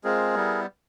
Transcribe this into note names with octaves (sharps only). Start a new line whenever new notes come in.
G#3 C4 F4 G#4 A#4
G3 B3 E4